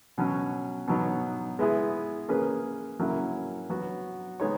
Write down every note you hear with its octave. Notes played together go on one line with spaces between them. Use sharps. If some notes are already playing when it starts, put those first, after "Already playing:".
B2 F#3 C#4
B2 F#3 B3 D#4
G#3 B3 E4 G#4
A#3 C#4 G#4 B4
F#3 A#3 C#4 E4 A#4
F#3 B3 F#4
G#3 B3 D#4 G#4 C#5